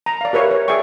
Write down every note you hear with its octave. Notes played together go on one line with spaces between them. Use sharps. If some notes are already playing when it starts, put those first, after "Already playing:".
A#5
D5 F5
G4 A#4 B4 C#5 E5 F5
C#5
G#4 D5 E5 G5 C#6